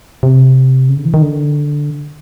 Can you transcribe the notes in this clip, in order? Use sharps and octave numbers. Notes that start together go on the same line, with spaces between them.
C3
C#3
D3
E3
D#3
D3